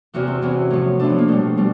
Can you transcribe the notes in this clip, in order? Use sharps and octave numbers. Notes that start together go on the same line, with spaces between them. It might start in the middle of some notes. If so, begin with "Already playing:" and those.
E2 C3 E3 F#4
C4
E2 C3 E3 C#4
A2 F3
A2 F3 D4
B3
A#3
B2 G3 A3
B2 G3